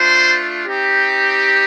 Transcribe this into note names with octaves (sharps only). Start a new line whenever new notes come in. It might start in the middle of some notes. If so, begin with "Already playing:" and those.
Already playing: A3 D4 F4 C5 C6
C4 D#4 G4